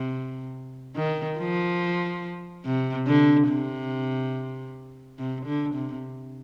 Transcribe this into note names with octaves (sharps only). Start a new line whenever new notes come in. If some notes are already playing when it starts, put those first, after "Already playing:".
Already playing: C3
D#3
F3
C3
D3
C3
C3
D3
C3